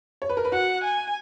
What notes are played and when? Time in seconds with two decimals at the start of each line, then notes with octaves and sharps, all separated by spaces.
0.22 C#5
0.29 B4
0.37 A#4
0.45 B4
0.52 F#4 F#5
0.84 G#5